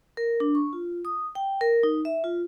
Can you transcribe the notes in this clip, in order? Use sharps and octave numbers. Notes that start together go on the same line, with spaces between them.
A#4
D4
C#6
F4
D#6
G5
A#4
D#4
E5
F4